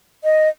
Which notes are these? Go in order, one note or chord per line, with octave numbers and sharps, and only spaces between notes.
D#5